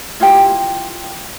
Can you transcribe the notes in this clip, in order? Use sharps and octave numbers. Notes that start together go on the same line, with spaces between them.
E4 F4 G4 G5